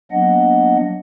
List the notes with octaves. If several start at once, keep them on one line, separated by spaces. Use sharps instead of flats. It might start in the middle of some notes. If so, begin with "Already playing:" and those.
F#3 A#3 B3 D4 D#5 F#5